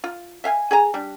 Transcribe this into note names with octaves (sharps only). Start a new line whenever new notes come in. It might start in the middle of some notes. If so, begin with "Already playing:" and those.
F4
E5 F5 G5 G#5
G#4 G#5 A#5
G3 D4